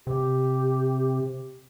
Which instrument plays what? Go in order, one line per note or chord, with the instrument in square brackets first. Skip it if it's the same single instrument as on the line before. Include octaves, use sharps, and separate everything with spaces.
[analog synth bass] C3 [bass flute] G4